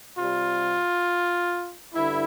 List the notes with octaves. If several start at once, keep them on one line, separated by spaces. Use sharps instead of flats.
C3 G3 F4
G2 D3 E4